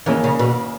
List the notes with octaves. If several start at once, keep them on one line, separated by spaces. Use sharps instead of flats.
D#3 E3 A#3 C#4 G#4 C#5
C#3
B2